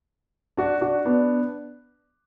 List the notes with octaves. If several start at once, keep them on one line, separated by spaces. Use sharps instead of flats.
D4 F#4
D4 F#4
B3 D4